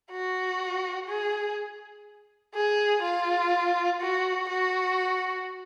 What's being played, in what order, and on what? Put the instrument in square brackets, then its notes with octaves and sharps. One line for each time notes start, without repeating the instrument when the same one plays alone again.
[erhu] F#4
G#4
G#4
F4
F#4
F#4